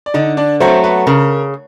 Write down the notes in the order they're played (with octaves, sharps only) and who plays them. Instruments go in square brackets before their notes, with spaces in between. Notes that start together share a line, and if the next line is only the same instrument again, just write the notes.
[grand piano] D5
[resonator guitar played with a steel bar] D3 [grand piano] D#4 D#5
[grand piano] D4 D5
[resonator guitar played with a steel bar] F#3 A3 [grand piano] C4 C5
[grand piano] B3 B4
[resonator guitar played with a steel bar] C#3 [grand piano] A#4